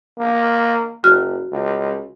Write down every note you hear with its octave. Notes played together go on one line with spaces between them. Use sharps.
A#3
F#1 F#4 F6
C#2